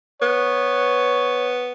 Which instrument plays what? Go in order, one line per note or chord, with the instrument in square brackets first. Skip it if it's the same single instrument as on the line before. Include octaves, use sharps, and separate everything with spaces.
[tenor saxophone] B3 [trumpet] C#5